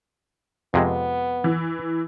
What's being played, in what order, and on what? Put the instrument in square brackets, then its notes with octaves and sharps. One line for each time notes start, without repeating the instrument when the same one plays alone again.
[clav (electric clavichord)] F2 C3 G#3 [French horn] B3
[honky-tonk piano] E3